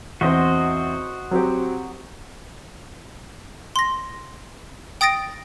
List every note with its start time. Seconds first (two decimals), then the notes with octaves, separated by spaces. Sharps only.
0.21 E2 C4 F#4 C5 D#5
1.31 F#3 C4 G4
3.76 C6 A#6
5.01 G5 D#6 A6 A#6 D7